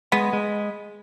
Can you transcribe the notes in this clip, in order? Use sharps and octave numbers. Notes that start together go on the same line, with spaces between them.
G#3 B3
G#3